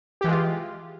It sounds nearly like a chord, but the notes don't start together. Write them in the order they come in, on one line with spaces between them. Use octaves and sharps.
G4 E3 G#3 F4